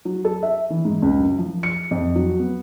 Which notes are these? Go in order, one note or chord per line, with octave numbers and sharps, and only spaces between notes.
F#3
A4
E5
E3
G#2
C#2
F#2
F3
C#7
F2
F#3
B3